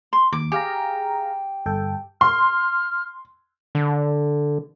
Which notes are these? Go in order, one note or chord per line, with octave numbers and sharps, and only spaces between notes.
C6
D#2 D6
G4 G#4 F5 A#5
G1 A4 G5
C6 F6
D3